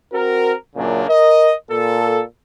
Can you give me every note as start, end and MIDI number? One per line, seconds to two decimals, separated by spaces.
0.13 0.54 60
0.13 0.54 66
0.13 0.54 70
0.76 1.04 42
0.76 1.04 46
0.76 1.04 49
0.76 1.04 58
0.76 1.04 62
1.09 1.53 70
1.09 1.53 75
1.70 2.22 46
1.70 2.22 69